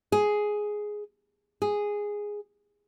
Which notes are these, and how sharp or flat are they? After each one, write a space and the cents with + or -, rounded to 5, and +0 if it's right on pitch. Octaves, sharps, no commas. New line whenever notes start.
G#4 +5
G#4 -5